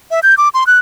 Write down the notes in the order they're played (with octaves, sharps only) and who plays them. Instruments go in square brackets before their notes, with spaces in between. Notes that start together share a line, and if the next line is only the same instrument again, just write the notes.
[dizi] E5
G6
D6
C6
F#6